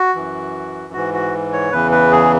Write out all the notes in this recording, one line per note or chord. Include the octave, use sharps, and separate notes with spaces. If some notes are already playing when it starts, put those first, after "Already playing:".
Already playing: F#4
F#2 E3
G#2 E3 F#4
F#4
C#5
E2 C#3 E3 B4
B4
G#4